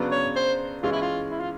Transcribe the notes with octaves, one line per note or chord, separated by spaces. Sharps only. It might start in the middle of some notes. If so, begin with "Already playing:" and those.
Already playing: C#3 F#3 B3 D4 F#4
C#5
C5
E3 G#3 C#4 F4
E4
F4
E4
F4